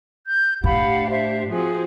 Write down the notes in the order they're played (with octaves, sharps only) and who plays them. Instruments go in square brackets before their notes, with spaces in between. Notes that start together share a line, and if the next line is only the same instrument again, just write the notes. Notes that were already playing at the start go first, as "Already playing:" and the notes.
[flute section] G6
[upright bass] A2 [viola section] D4 G4 [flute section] F5 F#5 B5
[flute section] C5 E5
[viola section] F3 C4 F#4 [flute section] G#4